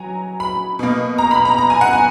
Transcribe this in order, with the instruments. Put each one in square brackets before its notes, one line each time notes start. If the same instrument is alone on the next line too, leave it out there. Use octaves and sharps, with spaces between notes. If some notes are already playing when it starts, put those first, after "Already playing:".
Already playing: [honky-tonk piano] F#3 G#5 A#5
B5
B2 A#3
A#5
B5
A#5
A#5
G#5
F#5
G#5